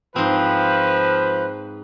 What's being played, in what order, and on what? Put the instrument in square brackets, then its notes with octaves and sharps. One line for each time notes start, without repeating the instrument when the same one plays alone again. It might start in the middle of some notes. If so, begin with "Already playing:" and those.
[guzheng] G#2 C4 [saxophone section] F3 [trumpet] B4